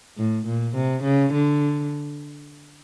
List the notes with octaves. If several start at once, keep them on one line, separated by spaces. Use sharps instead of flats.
A2
A#2
C3
C#3
D3